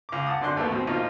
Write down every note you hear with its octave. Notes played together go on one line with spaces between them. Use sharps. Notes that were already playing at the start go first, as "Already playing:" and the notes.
C#2 D6
F#5 A5 D#6
F#2 D3 D5 C6 F#6
D#2 A3 B3
B2 C4
A#1 D#4 F4